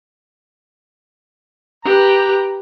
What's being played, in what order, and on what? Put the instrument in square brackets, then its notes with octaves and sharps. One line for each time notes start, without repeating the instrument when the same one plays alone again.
[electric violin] G4 B4 [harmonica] A#5